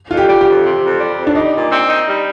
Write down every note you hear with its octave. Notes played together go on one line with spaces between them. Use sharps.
F2 F4
G4
G3
G4
F2
C3
F2
G3
F2
D4
G3 D#4
A#2
C4
D#4
G3